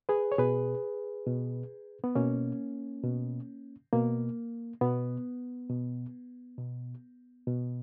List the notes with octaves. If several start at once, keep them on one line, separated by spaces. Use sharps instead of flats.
G#4 B4
C#5
B2 G#4 B4
B2
B3
B2 A#3 C#4
B2
B2 A#3
B2 B3
B2
B2
B2